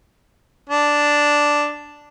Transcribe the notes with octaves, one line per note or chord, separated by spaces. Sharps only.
D4